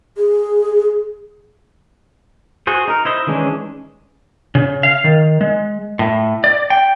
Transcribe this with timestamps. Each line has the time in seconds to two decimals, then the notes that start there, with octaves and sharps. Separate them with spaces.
0.17 G#4
2.67 F#4 G#4 C5
2.88 D#4 A#4
3.05 E4 C5 D#5
3.27 D#3 E3 G#3 C#4 D4
4.55 C#3
4.83 F5
5.04 D#3
5.41 G#3
5.99 A2
6.44 D5
6.70 G5